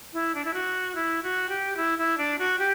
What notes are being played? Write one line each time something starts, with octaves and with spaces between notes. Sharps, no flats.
E4
D4
E4
F#4
E4
F#4
G4
E4
E4
D4
F#4
G4